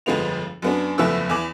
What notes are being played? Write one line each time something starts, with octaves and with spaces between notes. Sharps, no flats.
G1 F2 F3 G#3 B3 F7
F#2 B3 D4
F#1 E2 F3 A3 B3 E6
E2 E3 G#5 D6 F#7